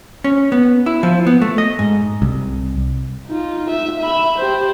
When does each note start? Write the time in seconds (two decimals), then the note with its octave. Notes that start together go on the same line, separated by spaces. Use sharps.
0.24 C#4
0.52 B3
0.86 E4
1.03 F3
1.27 B3
1.42 A3
1.58 D#5
1.79 G#2
2.22 C2
3.27 D#4 F4
3.70 E5
4.00 E5 B5
4.38 G4 C5